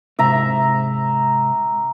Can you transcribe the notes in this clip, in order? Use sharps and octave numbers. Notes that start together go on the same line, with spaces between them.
G#2 C3 E5 A#5